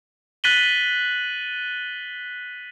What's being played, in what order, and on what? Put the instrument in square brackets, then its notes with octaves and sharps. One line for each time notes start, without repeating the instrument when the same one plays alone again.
[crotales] F#6 A6 B6 D#7 F#7 G7